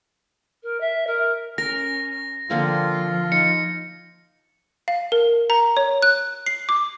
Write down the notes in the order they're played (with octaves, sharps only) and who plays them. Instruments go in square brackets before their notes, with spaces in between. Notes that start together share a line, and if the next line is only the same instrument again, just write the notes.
[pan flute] A#4
E5
A#4
[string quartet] C#4 [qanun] A#4 [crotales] A#6
[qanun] D3 A#3 C4 [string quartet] F3 [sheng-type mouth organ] F4
[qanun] D#4 [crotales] C#7
[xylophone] F5
A#4
A#5
C#5
F#6
C7
D6